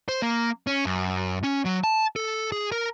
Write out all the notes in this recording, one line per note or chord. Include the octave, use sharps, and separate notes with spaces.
C5
A#3
C#4
F#2
C#4
F#3
A5
A4
G#4
A#4